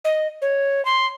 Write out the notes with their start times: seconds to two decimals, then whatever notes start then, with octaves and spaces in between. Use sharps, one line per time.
0.05 D#5
0.42 C#5
0.85 C6